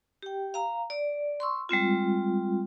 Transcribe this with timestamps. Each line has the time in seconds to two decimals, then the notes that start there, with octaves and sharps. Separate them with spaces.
0.23 G4 G5
0.54 F5 A#5
0.90 D5
1.40 C6 C#6 E6
1.69 G3 G#3 C4 F4